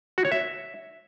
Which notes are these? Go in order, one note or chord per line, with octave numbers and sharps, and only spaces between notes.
F#4
C#5
E5